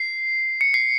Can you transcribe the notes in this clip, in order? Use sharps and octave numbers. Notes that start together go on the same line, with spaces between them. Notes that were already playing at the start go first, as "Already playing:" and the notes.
Already playing: C7
C#7
C7